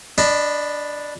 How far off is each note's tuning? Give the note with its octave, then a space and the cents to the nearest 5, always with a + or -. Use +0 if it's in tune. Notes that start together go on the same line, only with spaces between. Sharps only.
D4 +0 D#5 -25 B5 +0